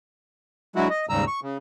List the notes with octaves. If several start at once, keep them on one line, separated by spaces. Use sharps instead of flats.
D3 F#3 G#3 E4 F#4
D#5
D#2 G#2 C#3 G3 A#5 E6
C#6
C#3